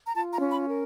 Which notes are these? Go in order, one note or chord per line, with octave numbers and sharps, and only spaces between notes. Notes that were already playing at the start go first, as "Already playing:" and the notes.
A#5
F4 A5
A#5
C#4
B5
A#4